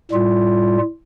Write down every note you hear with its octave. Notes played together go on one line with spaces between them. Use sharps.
A2 G3 F4